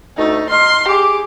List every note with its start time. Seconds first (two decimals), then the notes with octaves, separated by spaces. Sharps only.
0.17 D2 A3 D#4
0.50 D#4 C6 F6
0.88 G4 G#4 D6